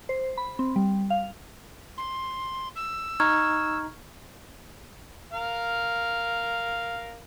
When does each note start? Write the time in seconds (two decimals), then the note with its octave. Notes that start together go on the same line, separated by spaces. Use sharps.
0.09 C5
0.37 B5
0.59 C4
0.76 G3
1.10 F5
1.97 C6
2.75 E6
3.20 D#4 D#5 A#5 C#6 F6 G#6
5.33 A#4 F5